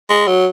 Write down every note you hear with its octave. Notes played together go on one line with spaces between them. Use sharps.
G#3
F#3